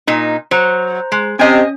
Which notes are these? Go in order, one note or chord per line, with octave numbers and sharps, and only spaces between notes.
A#2 D#4
F#3 C5 A#5
G#3
C3 C#4 D#5 G#5